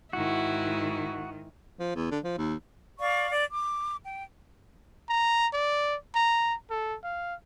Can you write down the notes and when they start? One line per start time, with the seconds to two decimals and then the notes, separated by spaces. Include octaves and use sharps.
0.13 G#2 D#3 E4 F#4
1.80 F3
1.95 E2
2.11 D3
2.24 F3
2.38 D#2
3.00 D5 F5 C#6
3.29 D5
3.51 D6
4.05 G5
5.09 A#5
5.54 D5
6.15 A#5
6.71 A4
7.04 F5